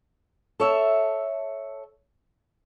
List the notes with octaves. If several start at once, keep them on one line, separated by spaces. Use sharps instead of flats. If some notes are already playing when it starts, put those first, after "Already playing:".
A4 C#5 E5